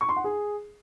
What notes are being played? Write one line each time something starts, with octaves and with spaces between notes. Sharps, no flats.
C#6
C6
F#5
G#4